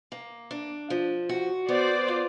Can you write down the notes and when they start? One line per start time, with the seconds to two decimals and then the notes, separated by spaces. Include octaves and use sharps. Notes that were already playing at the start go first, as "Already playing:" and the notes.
0.12 A#3
0.51 D4
0.90 F3
1.29 F#4
1.69 B3 C5 D5
2.08 F4